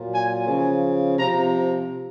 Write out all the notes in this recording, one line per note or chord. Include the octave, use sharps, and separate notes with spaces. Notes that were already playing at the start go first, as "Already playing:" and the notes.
Already playing: A#2 F#3
G#5
C#3 F3 G#5
C3 F3 A#5